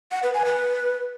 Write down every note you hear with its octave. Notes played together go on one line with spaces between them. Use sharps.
F#5
B4
G#5
B4